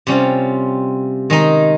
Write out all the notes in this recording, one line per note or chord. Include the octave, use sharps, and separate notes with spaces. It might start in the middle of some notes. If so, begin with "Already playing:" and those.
C3 G3 C#4 F4
D#3 G#3 D#4